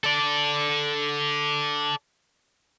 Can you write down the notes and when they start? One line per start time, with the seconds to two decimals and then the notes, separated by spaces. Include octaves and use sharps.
0.04 A4 D5